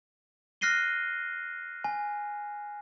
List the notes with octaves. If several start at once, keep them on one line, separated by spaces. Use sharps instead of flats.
F6 F#6 A#6 C7 D#7 G7
G#5